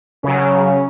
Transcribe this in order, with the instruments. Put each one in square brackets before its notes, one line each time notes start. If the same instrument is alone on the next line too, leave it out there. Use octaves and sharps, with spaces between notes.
[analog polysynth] C#3 F#3 [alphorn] C#4